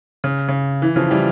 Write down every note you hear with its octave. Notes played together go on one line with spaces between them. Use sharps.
C#3
C#3
E3
C#3 F3
E3 G3